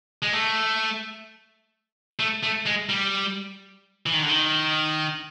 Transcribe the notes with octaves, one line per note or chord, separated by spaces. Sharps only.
G#3
A3
A3
A3
G#3
G3
E3
D#3
D3
D#3